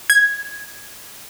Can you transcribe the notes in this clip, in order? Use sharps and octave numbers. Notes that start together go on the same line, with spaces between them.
G#6